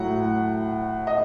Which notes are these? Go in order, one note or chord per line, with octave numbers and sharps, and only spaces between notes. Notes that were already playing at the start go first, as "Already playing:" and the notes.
Already playing: A2 F#3 F#5
D#5